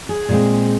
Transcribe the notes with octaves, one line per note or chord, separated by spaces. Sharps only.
G#4
A#2 G#3 C4